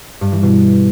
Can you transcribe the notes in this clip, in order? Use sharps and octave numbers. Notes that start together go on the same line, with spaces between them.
G2
E3
B2